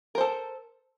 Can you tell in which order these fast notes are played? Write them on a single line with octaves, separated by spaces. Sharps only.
A#4 C5 A4